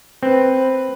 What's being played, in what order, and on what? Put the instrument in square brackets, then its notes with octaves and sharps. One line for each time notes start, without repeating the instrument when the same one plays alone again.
[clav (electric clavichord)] C4 [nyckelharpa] B4